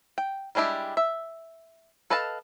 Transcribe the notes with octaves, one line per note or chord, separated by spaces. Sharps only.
G5
G3 G#3 D4 E4 G4
E5
A4 B4 D#5 F5 A5